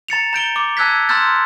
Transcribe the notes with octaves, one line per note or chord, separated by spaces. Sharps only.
A#5 A6 C#7 F7
A#5 G6 D7 G7
D6
A5 E6 F#6 G#6 B6
A#5 C6 E6 F6 G6 A6